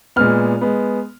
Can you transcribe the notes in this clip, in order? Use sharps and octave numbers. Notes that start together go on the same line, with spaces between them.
A#2 G#3 B3 F6
G#3 B3